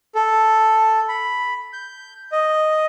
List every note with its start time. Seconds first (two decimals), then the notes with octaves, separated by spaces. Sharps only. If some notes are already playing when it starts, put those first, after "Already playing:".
0.15 A4
1.09 B5
1.73 G6
2.32 D#5